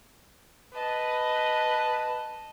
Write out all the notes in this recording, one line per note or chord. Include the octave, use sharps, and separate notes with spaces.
B4 D#5 A5